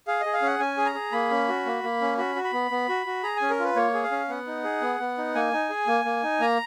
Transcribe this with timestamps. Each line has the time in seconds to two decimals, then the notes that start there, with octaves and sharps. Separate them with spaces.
0.07 G#4 F5
0.21 G#4 D#5
0.33 F5
0.42 C#4 F#5
0.59 C#4 G#5
0.77 G#4
0.86 A#5
0.95 G#4
1.12 A#3 B5
1.31 C#4
1.48 F#4
1.65 A#3
1.83 A#3
2.01 C#4
2.18 F#4 B5
2.36 F#4
2.44 B5
2.53 B3
2.71 B3
2.89 F#4
3.06 F#4
3.23 G#4 A#5
3.36 G#5
3.42 C#4
3.50 A#4
3.59 F4 B4
3.76 A#3 C#5
3.94 G#4
4.04 F5
4.11 C#4
4.29 B3 F#5
4.47 D#4
4.64 G#4
4.82 B3
5.00 B3
5.18 D#4
5.35 A#3 G#5
5.53 D#4
5.70 G#4
5.87 A#3
6.05 A#3
6.23 D#4
6.40 A#3 A#5